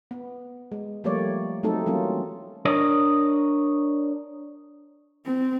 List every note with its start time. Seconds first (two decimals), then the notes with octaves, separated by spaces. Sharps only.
0.11 B3
0.72 G#3
1.04 F3 G3 A3 A#3 C#5 D5
1.63 F#3 A3 C4 D#4 A4
1.86 E3 F#3 G3 A#3 C#4 F4
2.65 D4 A#4 C#5 D#5
5.25 C4